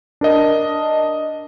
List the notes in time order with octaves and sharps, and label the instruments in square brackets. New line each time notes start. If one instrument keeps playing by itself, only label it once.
[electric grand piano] D4 A#4 D#5